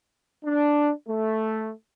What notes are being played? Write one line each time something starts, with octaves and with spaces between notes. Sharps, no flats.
D4
A3